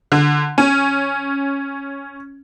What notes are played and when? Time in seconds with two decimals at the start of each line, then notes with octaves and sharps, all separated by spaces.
0.12 D3
0.58 C#4